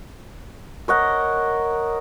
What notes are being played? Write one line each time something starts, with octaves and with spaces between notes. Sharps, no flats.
A#4 C#5 D#5 F#5